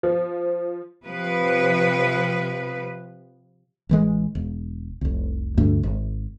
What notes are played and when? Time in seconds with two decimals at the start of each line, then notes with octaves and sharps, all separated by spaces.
0.03 F3
1.05 C3 F3 B4
3.89 A1 E3 G#3
4.35 E1
5.01 F1 C2
5.57 D2 G2 A3 D4
5.83 G#1